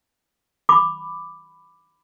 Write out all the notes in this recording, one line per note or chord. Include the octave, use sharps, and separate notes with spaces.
B5 D6